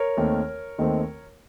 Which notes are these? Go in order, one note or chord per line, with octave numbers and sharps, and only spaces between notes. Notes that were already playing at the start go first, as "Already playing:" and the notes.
Already playing: A#4 C#5
D#2 D#3 A3 C4
D#2 D#3 A3 C4